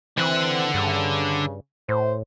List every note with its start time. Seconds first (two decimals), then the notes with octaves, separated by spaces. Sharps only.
0.18 D3 E3 C4 F#5
0.74 G2 C#3
1.89 A2 C5